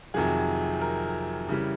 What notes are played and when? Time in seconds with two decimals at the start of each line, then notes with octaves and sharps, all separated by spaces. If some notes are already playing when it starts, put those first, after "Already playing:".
0.14 F2 C3 D#3 F#3 G#4
0.81 A#4
1.48 C#3 E3 G3